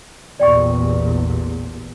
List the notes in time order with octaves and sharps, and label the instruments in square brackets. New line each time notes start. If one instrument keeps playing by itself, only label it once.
[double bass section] A1 E2 A#2 [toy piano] D5 G5 C#6